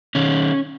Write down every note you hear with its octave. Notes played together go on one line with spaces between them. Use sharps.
D#3 C#4